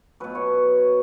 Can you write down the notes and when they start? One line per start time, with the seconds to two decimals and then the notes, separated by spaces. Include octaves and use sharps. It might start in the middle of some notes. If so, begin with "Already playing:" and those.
0.20 B2 F#3 B4
0.35 C#5